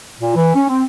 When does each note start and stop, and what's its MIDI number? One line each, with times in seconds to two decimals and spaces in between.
0.20 0.34 46
0.35 0.51 52
0.55 0.64 61
0.69 0.82 60